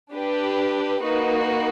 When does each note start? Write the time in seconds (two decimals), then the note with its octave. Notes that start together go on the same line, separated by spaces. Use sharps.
0.13 D4 G4 B4
1.01 A#3 D#4 F#4 B4